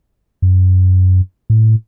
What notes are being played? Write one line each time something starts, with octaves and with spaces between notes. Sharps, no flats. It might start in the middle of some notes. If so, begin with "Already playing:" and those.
F#2
A2